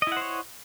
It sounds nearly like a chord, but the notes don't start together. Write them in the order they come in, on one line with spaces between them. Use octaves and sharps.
D#5 E4 F#5 C5 C#5